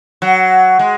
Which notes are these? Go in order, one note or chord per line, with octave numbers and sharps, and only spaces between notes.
F#3
G#3